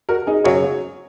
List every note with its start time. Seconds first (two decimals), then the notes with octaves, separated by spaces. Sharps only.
0.09 F#4 A#4
0.27 D#4 G#4
0.44 F#2 C#3 F#3 G#4 C#5